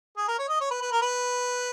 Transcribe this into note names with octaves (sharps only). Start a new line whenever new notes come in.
G#4
A#4
C#5
D#5
C#5
B4
B4
A#4
B4